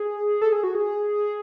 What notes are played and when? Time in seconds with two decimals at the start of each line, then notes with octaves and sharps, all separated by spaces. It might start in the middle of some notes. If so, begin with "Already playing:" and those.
Already playing: G#4
0.42 A4
0.52 G#4
0.63 F#4
0.75 G#4